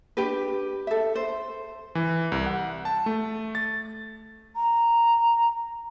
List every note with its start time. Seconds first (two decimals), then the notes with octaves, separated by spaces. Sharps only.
0.17 D4 G4 B4
0.87 A4 E5
1.15 C5
1.95 E3
2.32 C2
2.46 F#5
2.85 A5
3.06 A3
3.55 A6
4.56 A#5